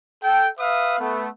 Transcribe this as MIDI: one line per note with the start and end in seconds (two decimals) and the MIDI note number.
0.22 0.48 69
0.22 0.48 79
0.58 0.98 71
0.58 0.98 76
0.58 0.98 77
0.58 0.98 87
0.99 1.28 57
0.99 1.28 59